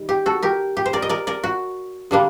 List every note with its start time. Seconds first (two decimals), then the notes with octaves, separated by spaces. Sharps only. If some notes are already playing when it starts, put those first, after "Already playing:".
Already playing: D#3 G3
0.09 G4
0.26 F#4 A4
0.42 G4 A#4
0.77 G4
0.86 C5
0.93 A#4 D5
1.02 D#5
1.09 A#4 D5
1.27 A#4 D5
1.44 F#4
2.11 D3 G3 A#3 D4